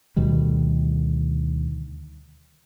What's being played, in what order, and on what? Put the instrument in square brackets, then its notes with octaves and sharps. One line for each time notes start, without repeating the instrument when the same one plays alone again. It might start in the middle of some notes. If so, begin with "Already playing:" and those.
[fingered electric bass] D2 B2 D#3 G3